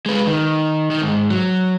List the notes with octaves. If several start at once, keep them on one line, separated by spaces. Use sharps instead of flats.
G#3 B4
D#3
D#3
G#2
F#3